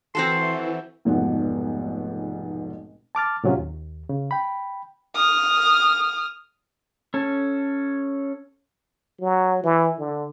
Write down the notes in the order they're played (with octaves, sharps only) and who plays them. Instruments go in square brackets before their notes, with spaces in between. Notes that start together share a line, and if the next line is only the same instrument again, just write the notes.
[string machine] E3 [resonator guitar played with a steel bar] C4 F#4 A4 [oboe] C6
[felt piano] F1 B1 G#2 B2 F3 F#5
[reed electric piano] A5 D6 F6 A6
A2 C3 F#3 C#4 F4
D#2
C#3
G5 B5
[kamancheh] D#6 F6
[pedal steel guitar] C#4 A4
[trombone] F#3
E3
D3